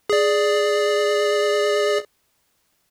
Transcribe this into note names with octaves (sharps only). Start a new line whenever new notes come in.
G#4 D5